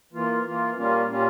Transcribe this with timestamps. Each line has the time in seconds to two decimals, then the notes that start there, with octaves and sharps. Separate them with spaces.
0.13 E3 A#3 F4
0.45 E3 A#3 F4
0.76 A#2 G3 A#3 C#4 F4
1.09 A#2 G3 A#3 C#4 F4